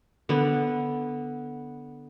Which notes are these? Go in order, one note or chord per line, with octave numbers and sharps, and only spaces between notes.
D3 B3